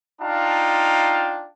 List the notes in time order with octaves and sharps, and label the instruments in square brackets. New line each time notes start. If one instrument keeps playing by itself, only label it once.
[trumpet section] D4 D#4 F4 F5 G5 A5